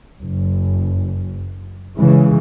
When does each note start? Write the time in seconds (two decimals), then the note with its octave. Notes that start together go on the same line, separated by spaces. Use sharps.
0.21 F#1
1.97 C#3 E3 G#3